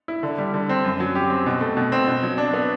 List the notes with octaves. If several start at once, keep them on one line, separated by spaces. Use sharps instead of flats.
E4
D3
G3
D3
C4
F#2
F#3
G4
C4
B2
A3
B2
C4
B2
F#3
D4
B3